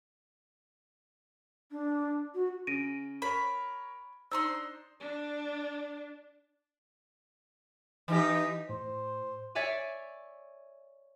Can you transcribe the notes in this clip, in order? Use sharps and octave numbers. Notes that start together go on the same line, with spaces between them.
D4
F#4
C#3 A#6 D7 D#7
A#4 C#5 B5
D4 D#4 C5 A#5 C6 E6
D4
E3 D#4 G4
A2 C5
C#5 D5 E5 G#5 D6